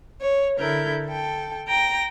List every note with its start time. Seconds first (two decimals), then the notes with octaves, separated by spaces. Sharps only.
0.21 C#5
0.59 D3 E4 A4 A#4 G6
1.07 A4 G5
1.68 G5 A#5 A#6